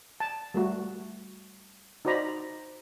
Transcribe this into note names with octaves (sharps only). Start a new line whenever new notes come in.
A5
G3 A3 F#4
D#4 F#4 C5 D5 A#5 B5